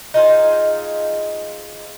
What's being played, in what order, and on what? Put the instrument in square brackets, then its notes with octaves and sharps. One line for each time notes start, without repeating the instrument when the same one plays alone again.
[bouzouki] D#4 F4 G#4 C5